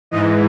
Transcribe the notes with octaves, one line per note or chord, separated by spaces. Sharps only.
G#2 E3 D#5